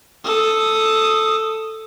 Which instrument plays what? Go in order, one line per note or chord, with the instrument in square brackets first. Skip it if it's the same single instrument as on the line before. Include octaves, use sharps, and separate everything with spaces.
[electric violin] A4 D#6